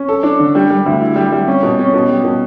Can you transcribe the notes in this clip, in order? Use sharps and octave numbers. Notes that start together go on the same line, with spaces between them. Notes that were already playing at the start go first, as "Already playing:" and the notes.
Already playing: C#4
A4
D4
D3
G3
G3
D2
E4
G3
G3
C#4
B2
C#4
B2
G3
B2